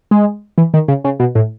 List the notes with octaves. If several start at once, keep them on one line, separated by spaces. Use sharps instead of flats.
G#3
E3
D#3
C#3
C#3
B2
A2